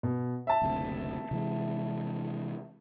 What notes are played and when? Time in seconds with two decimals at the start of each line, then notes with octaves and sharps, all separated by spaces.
0.03 B2
0.47 E5 A5
0.62 F#1 D2 C3
1.31 C3 E3 G#3